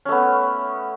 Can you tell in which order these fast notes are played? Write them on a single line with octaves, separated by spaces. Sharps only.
C#4 A3 B3